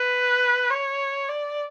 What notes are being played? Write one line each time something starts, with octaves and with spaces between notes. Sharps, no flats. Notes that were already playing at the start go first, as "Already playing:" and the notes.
Already playing: B4
C#5
D5